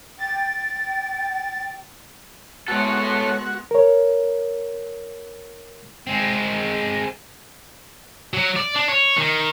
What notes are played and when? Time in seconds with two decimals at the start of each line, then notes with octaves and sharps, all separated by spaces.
0.19 G5 A6
2.68 G#3 B3 F#4 A4 C#5
3.71 A#4 C#5
6.07 G#3 C4
8.34 F#3
8.56 D5
8.76 D4
8.88 C#5
9.17 D#3